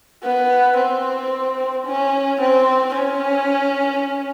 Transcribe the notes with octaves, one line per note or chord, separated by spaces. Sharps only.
B3
C4
C#4
C4
C#4